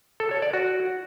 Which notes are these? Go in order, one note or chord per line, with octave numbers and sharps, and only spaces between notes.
A4
C#5
D5
F#4